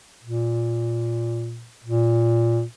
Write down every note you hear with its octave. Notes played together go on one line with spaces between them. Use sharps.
A#2
A#2